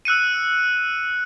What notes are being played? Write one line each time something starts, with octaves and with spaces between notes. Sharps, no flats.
E6 F#6 C#7 D#7